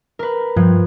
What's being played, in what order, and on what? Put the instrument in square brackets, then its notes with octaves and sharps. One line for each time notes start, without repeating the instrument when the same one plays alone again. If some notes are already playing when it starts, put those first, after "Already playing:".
[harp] A#4 B4
[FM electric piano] G2 [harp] F3